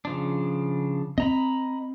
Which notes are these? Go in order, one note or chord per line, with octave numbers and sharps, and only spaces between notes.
C#3 F3 D4
C4 D#5 A#5 B5